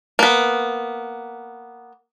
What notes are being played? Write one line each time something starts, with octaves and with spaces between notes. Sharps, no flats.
A#3 B3